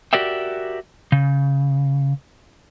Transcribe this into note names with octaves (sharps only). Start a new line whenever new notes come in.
F#4 G4 A#4 D5 E5 G5
C#3